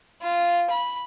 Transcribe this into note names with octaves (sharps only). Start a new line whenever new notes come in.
F4
B5